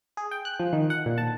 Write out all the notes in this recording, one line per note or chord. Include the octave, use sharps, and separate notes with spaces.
G#4
G5
F#6
F3
D#3
F#5
A#2
A5